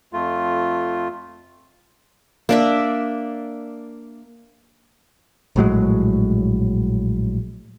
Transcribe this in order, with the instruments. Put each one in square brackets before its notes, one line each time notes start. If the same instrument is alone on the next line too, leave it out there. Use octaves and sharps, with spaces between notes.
[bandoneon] F2 A3 F4
[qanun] A#3 D4 E5
[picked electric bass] A#1 A2 F#3 G#3